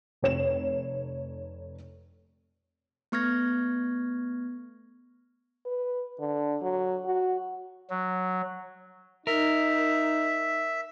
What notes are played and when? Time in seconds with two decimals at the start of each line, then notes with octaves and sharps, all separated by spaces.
0.22 F1 C#5 E7
3.12 A3 B3 C#6 F6 G#6 A#6
5.66 B4
6.20 D3
6.62 F#3
7.05 F#4
7.90 F#3
9.27 D#4 A#4 E5